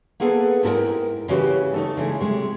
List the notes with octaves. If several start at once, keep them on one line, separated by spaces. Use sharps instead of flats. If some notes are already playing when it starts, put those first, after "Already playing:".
A#3 B3 G#4 A4 B4
G#2 B3 E4 A4 A#4 G5
C#3 E3 F#4 G4
A3 D#4 A4
C#3 E3 G#3 A3
C3 G#3